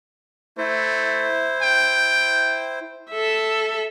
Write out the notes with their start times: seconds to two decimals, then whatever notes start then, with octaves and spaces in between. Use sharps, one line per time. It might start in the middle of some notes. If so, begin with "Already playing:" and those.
0.58 A3 E4 C5
1.62 G5
3.10 A4 E5